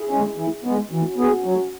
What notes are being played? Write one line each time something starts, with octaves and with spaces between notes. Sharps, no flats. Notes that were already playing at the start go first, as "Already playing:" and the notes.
Already playing: E4 G#4
G#3 C#4
E3
G#3 B3
E3 C#4 F#4
B3 G#4
F#3